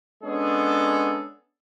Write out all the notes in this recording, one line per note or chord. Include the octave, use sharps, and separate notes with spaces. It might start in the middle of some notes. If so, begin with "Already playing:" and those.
G#3 B3 C#4 D4 G#4 A4